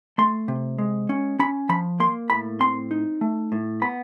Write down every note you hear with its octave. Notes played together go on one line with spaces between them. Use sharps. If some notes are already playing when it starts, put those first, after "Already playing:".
A3 C6
C3
G#3
C#4
C#4 B5
F3 B5
A#3 C6
A2 B5
C4 C6
D#4
A3
A2
B3 B5